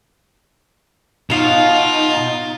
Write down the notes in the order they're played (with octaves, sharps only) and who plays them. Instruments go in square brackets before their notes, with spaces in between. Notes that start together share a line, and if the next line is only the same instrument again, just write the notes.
[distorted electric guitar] B2 [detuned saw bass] D#4 [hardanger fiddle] F4 [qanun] C#5 F5